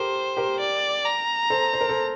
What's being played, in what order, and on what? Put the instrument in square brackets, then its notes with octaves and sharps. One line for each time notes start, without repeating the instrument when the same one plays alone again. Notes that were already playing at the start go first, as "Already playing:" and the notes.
Already playing: [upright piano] G4 A4 A#4 [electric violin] C5
[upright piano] G4 A#4
[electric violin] D5
A#5
[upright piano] A4 C5
C5
A#4
A4 C5